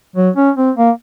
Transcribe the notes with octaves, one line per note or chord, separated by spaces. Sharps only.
F#3
C#4
C4
A#3